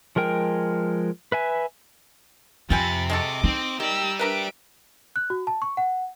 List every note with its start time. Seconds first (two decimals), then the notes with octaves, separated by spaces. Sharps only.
0.16 F3 G#3 A#4 G5
1.32 B4 E5 G#5
2.70 F2 C3 F4 G5 G#5 B5 A6
3.10 G#3 F#4 A4 D#5 D6
3.44 C4 D#4
3.80 D#3 G4 D5 A#5 E6
4.19 D4 A#4 B4 E5 D7
5.16 F#6
5.30 F#4
5.47 A5
5.62 C#6
5.77 F#5